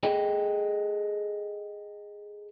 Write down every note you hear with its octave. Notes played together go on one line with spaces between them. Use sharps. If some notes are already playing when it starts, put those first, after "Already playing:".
G#4 A4 D#5 G5